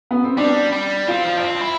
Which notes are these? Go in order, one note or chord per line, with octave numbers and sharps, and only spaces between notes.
B3
C4
G3 D4
G3
C4 F4
F3
D4
C4
E4